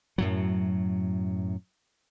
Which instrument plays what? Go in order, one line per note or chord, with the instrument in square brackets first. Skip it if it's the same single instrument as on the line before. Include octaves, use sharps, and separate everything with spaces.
[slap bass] F#2 A2 F#3